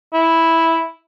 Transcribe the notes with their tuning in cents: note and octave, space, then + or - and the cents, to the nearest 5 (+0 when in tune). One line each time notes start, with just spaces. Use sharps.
E4 -5